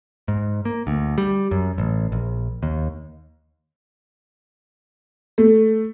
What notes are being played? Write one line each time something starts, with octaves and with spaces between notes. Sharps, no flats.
G#2
A#3
D2
G3
F#2
A1
A#1
D#2
A3